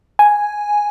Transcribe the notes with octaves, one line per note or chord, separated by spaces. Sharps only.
G#5